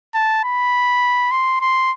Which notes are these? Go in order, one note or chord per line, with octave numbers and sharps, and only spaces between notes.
A5
B5
C6
C6